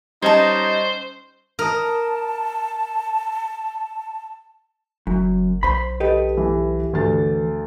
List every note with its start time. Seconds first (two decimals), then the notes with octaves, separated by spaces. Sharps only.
0.22 G3 C#4 D#4 C5 C#5 D#5 A5
1.59 A#4 D#5 A5
5.07 F#1 F#2
5.63 B1 C5 B5
6.00 G4 A4 B4 D#5
6.37 E3
6.93 D2 E3 A6